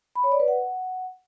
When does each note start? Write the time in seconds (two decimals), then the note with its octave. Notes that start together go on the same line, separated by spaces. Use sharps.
0.16 B5
0.24 C#5
0.32 D5
0.40 B4
0.48 F#5